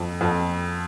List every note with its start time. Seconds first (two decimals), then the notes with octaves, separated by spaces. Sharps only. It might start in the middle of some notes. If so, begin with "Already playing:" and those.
Already playing: F2
0.21 F2